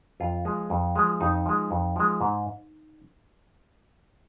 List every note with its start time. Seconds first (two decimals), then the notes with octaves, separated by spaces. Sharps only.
0.20 F2 F4
0.45 F3 G#3
0.70 F2
0.96 F3 G#3
1.21 F2 D#4
1.46 F3 G#3
1.71 F2
1.96 F3 G#3
2.21 G#2